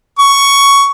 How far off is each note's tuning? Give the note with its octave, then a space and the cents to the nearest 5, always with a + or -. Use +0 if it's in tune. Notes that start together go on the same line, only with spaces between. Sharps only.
C#6 +10